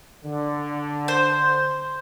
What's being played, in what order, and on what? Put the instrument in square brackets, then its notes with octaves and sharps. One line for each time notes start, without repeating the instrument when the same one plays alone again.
[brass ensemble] D3
[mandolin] C5